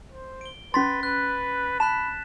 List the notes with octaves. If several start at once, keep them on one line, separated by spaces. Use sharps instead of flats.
C5
D7 G7
C#4 B4 C6 A6 B6
B4 F#6
A5 B5 F#6 B6 E7